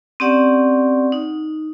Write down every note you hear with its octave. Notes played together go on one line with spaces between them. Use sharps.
C4 C#4 G4 D5 F#5
D#4